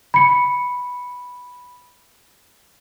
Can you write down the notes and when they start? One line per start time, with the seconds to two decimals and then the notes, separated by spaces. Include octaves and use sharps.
0.14 B5 C#7